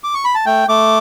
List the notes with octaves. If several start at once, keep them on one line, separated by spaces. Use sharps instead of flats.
D6
C#6
B5
A5
A3 G5
A3 D6